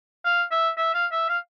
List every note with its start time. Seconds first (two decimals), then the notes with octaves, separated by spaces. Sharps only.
0.25 F5
0.51 E5
0.77 E5
0.94 F5
1.12 E5
1.29 F5